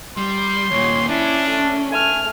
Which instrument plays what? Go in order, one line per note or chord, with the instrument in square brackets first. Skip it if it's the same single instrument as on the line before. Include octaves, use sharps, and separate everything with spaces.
[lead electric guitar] G3 [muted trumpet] C6
[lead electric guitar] D#2 A#2 [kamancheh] C#5
[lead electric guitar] C#4 [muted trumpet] D4 [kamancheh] E4
[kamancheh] A3
[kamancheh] A3 F6 [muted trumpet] G#5